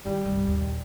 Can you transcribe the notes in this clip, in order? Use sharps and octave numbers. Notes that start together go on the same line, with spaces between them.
D#3 G3 E4
G1 C2
A#1 D#2